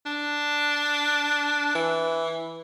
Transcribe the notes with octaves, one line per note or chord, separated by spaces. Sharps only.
D4
E3